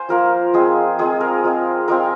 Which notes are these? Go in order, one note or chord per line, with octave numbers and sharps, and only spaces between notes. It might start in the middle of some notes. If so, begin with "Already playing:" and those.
Already playing: C5 F5 G#5
F3 A#3 F4 A#4
F3 G#3 C4 G#4
F3 G#3 C4 G#4
A#4
F3 G#3 C4
F3 G#3 C4 A#4